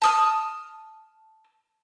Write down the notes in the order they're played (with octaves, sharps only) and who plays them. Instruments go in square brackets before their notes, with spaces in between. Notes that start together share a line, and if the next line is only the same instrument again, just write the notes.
[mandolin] A5 D#6 F6